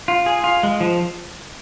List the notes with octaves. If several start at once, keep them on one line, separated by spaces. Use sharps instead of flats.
F4
G#4
F4
G#3
F3